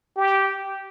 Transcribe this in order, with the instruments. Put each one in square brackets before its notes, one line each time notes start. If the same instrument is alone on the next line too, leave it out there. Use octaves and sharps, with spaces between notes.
[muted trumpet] G4